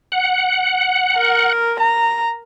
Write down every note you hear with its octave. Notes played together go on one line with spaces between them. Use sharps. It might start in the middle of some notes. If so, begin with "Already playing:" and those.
F#5
A#4
A#5